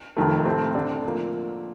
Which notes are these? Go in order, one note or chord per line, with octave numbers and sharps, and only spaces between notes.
F1 F2 D#3 A3
A2 A3 C4
D3 A3 D4 A4 D5
F3 A#3